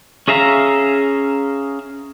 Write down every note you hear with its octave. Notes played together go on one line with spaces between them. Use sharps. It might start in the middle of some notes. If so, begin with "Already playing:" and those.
C#4 G#4 E5 F5 A#5